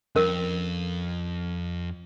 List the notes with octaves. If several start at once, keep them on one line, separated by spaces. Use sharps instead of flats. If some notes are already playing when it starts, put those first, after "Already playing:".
F2 C#4 A#4